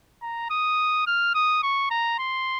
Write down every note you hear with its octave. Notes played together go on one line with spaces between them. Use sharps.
A#5
D#6
F6
D#6
C#6
A#5
C6